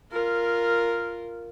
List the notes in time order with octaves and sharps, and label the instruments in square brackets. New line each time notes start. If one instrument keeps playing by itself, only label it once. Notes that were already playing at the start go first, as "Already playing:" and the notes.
[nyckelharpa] F4 A#4